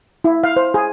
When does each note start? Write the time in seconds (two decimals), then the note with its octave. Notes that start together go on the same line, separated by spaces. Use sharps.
0.24 E4
0.44 F5
0.56 C5
0.74 G#4